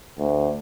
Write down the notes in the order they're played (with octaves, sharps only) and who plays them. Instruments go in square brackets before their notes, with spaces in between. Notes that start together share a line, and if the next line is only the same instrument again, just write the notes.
[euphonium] D2